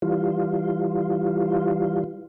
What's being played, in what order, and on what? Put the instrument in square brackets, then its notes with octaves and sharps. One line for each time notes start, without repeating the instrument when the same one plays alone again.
[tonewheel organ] E3 G3 F4